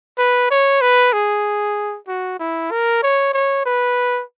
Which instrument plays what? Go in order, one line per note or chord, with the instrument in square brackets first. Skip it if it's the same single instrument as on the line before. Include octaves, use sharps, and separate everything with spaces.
[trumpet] B4
C#5
B4
G#4
F#4
E4
A#4
C#5
C#5
B4